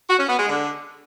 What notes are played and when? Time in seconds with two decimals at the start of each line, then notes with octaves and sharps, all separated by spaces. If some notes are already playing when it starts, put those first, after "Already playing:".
0.09 F#4
0.19 C#4
0.29 B3
0.39 G#3
0.48 D3